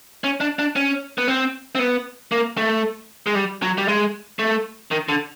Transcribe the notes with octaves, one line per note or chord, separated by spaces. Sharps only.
C#4
D4
D4
C#4
B3
C4
C4
B3
A#3
A3
G#3
G3
F#3
G3
G#3
A3
D#3
D3